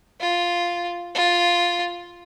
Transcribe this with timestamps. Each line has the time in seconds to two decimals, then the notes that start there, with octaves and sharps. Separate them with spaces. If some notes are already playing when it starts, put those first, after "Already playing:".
0.21 F4
1.15 F4